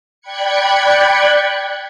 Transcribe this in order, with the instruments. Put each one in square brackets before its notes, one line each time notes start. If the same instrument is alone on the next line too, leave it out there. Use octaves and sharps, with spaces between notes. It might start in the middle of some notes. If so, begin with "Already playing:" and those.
[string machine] D5 G5 B5 F#6 G#6 C#7